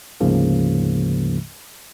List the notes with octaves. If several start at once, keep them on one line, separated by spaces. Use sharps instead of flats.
D2 G#2 C#3 F3 A#3